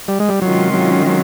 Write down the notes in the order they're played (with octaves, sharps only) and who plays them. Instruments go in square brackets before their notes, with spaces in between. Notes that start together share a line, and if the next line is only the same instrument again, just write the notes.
[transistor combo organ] G3
G#3
G3
[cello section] C3 D#3 G#3 C#4 F4 [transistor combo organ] F#3
[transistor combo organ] F#3
F#3